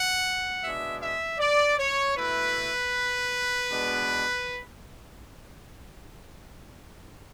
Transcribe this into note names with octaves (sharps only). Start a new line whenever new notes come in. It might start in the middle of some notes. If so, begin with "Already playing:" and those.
Already playing: F#5
B2 G#3 D4 E5
E5
D5
C#5
B2 A3 E4 B4
B2 G#3 B3 D4